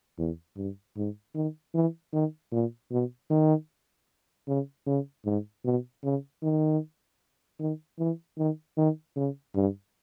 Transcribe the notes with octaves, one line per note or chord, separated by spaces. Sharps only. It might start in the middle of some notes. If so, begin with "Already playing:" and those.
E2
G2
G#2
D#3
E3
D#3
A#2
B2
D#3
C#3
C#3
G#2
B2
C#3
D#3
D#3
E3
D#3
D#3
C#3
G2